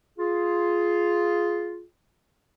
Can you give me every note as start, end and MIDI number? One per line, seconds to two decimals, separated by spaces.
0.18 1.82 65
0.18 1.82 68